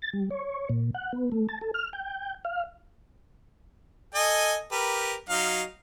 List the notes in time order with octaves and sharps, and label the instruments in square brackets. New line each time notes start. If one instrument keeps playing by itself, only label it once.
[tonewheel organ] A6
G3
C#5
A#2
F#5
B3
A3
A5
A4
F6
G5
F5
[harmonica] A4 D#5 G#5
G4 A#4 B4
F#3 D#4 F5